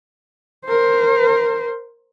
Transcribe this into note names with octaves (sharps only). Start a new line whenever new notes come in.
A#4 C5